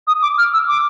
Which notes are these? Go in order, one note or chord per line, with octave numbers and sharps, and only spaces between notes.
D#6
D6
F6
E6
D6